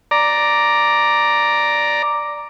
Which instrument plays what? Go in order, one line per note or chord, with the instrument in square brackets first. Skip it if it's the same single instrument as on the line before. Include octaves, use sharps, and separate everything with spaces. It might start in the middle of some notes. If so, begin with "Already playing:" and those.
[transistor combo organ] D5 A#5